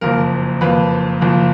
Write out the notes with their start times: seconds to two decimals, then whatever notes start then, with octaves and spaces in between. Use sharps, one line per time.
0.01 F#1 F2 F3 A#3 A#4
0.61 F#1 F2 F3 A#3 B4
1.21 F#1 F2 F3 A#3